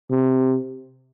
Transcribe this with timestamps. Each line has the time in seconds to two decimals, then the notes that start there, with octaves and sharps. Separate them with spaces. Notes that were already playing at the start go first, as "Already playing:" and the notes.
0.11 C3